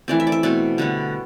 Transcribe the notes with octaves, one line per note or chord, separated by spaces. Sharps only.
E3 A3 C4 D5
E5
D5
E5
B2 A3 C4 D5
D3 G3 B3